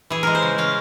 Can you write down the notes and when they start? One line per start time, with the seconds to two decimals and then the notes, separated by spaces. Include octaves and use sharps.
0.10 E3 G#4
0.23 G#3 A#4
0.35 C5
0.42 C#3
0.58 C#4 F5